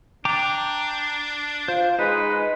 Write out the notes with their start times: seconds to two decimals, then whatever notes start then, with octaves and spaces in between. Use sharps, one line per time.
0.25 D4 G5 A#5 D6
1.68 F4 C5
1.99 G#3 D#4 B4